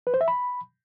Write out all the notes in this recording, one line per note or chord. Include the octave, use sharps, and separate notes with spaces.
B4
C5
E5
B5